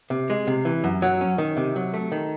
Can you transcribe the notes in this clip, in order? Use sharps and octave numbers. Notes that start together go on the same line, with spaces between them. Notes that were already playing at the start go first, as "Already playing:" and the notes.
C3
G#3
C3
E3
F#2
F#3
C#4
D#3
C3
F#3
A3
D#3